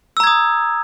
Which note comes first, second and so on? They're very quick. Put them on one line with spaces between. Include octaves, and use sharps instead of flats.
E6 A#5 G#6 D#6